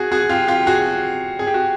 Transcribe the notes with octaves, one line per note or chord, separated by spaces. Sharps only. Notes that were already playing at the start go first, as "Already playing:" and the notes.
Already playing: F#4 G#4
F#4 G#4
F4 G4
F4 G4
F#4 G#4
G#4
G4
F#4